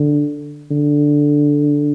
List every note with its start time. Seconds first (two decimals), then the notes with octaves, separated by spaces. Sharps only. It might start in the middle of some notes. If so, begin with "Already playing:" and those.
Already playing: D3
0.71 D3